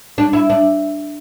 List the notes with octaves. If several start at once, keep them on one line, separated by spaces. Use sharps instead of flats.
D4
E4
D4